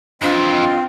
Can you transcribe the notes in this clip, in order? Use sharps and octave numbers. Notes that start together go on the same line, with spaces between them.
F2 E3 C4 D4 F4 D#5